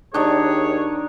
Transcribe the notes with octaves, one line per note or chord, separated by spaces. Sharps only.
D#2 D#3 D4 G#4 C#5